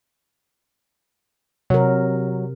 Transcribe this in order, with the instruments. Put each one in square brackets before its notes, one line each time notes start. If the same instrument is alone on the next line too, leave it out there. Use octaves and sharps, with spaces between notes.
[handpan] C3 A#4 [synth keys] F#3